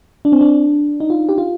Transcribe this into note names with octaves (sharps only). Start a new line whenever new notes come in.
D4
C4
D4
D#4
F4
G4
F4